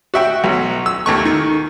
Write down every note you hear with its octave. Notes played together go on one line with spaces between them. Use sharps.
F#4 E5 G5
B1 F#3
E6
D#2 A3 C#6
D#3